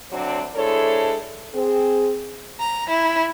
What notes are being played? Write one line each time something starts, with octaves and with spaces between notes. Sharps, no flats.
D2 F#3 C4 D4 C5
G#3 D4 E4 A4 C5 C#5
C4 G#4
A#5
E4